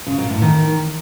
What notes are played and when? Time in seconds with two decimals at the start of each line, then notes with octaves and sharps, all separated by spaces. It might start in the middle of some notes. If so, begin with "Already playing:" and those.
0.07 C#3
0.18 A#2
0.30 A2
0.42 D#3